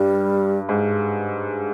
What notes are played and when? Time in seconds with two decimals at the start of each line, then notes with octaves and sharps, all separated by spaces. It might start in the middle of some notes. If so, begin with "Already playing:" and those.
Already playing: G2 G3
0.69 G#2